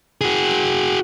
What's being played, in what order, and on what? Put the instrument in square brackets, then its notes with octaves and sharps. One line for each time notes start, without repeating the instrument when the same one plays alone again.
[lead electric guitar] F#4 G#4